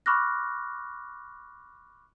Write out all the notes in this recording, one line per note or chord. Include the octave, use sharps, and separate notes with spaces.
B5 C#6 D6 F6 F#6 A#6